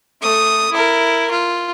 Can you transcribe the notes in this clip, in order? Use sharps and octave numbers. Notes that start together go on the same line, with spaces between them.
A3 D#6
E4 A#4
F4